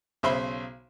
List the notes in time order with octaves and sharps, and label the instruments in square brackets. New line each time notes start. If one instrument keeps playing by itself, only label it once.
[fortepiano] B1 C#3 C5 E5 B5 C6